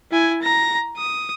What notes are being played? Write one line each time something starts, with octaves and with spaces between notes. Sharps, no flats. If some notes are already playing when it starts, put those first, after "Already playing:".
E4 G#5
A#5 A#6
D#6